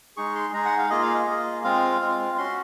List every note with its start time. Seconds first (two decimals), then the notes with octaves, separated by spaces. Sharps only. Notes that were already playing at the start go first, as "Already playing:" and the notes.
0.17 G#3 D#4 G#4 C#6
0.35 C6
0.53 G#3 D#4 G#4 A#5
0.65 F#5
0.78 F5
0.90 A#3 F4 G#4 D#5
1.02 F5
1.14 D#5
1.27 A#3 F4 G#4
1.64 G#3 C4 F4 F5
2.01 G#3 C4 F4
2.38 C#4 F#4 C6